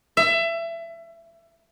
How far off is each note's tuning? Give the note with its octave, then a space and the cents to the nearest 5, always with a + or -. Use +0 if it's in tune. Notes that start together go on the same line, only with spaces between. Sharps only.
E5 +25